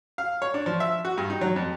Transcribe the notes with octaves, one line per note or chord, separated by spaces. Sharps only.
F5
C#5
D4
F3
E5
F#4
G2
D#4
F#3
F2